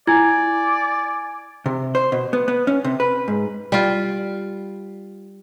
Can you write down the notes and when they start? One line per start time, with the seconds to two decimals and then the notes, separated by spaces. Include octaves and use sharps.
0.07 E4 D5 G#5 G#6
1.66 C3
1.95 C5
2.12 B2
2.33 B3
2.48 B3
2.67 C#4
2.84 C3
3.00 B4
3.28 G#2
3.72 G3 F4